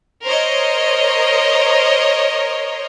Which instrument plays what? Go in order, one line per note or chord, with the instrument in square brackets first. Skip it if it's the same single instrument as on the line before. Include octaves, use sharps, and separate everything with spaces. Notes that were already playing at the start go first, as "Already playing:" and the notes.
[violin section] A#4 C5 C#5 D#5